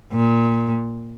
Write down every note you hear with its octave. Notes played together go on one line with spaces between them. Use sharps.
A#2